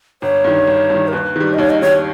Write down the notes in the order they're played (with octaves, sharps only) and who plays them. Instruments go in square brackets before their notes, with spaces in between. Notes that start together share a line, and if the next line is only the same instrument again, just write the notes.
[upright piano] G1 [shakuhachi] C#5
[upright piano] G2 D#3
G1
G2 D#3
[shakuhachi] A#4
[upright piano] D#2 [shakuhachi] B4
[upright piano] D#3 G3
[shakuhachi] D#5
[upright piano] D#2 [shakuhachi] C#5
[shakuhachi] D#5
[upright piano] D#3 G3 [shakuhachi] C#5